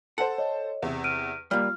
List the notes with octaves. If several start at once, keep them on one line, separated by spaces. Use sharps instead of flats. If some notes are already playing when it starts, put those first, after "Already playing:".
A4 C5 F#5
C#5 D#5
E2 C3
F6 D7 D#7
G3 A#3 F4 F6